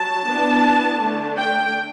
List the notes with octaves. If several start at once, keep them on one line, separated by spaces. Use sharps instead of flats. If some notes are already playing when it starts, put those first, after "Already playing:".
Already playing: F#3 A5
E3 B3 D4
D3 A3 D4
G5